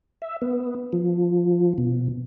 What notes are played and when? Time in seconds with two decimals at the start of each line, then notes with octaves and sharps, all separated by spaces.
0.22 E5
0.42 B3
0.93 F3
1.78 B2